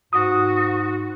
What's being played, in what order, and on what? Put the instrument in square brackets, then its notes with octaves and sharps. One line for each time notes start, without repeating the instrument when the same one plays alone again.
[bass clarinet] G#2 [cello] F#4 [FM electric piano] D#6